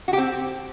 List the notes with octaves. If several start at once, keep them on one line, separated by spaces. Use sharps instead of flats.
F#4
G4
C4